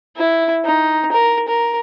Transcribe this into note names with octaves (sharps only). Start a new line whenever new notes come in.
E4
D#4
A#4
A#4